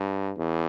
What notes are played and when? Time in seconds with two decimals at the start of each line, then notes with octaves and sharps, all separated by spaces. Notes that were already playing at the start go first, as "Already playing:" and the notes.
Already playing: G2
0.37 E2